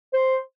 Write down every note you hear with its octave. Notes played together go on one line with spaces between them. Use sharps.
C5